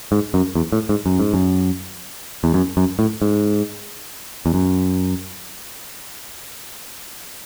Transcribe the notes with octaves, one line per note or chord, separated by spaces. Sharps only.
G#2
F#2
E2
A2
G#2
F#2
G#2
F#2
E2
F#2
F#2
A2
G#2
E2
F#2